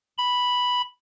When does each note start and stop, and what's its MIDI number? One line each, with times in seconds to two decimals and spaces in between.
0.18 0.81 83